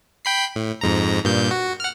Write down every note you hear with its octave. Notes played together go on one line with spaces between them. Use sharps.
G5 B5 C7
A2
F2 G#2 A#5
G2 A#2 G6
F#4
F#5 F6